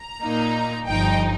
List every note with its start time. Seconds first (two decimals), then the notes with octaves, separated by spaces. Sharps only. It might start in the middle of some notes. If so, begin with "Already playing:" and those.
Already playing: A#5
0.22 A#2 A#3 D#4
0.86 G1 G2 F3 D#4 G5